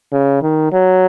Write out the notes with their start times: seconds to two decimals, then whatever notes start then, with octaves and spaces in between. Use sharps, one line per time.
0.12 C#3
0.42 D#3
0.72 F#3